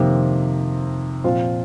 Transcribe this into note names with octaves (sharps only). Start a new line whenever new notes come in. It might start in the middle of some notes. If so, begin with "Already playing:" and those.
Already playing: F2 C3 D#3 A#3
A#2 F3 C4 F4